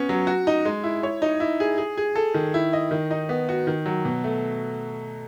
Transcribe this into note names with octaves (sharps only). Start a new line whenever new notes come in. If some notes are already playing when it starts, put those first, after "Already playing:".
Already playing: B3 C#4
F#3
F#4
D#4
G#3
E4
C#5
D#4
E4
G#4
G#4
G#4
A4
D#3
E4
D#5
D#3
D#4
B3
F#4
D#3
F#3
B2
A3